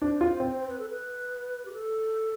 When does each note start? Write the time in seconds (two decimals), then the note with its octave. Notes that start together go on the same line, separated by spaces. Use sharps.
0.02 D4 C5
0.21 F4
0.40 C4
0.59 C5
0.69 B4
0.79 A4
0.90 B4
1.65 G4
1.73 A4